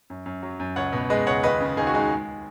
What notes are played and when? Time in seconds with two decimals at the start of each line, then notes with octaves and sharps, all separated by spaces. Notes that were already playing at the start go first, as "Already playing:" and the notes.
0.10 F#2
0.26 F#2
0.43 F#3
0.60 F#2
0.76 C#2 C#5 F#5
0.93 B2
1.10 G#3 B4 D#5
1.27 C#2 C#5 F#5
1.43 D#2 B4 D#5
1.60 C#3
1.77 D#2 D#4 G#4
1.87 F#4
1.93 G#3 D#4
2.11 G#3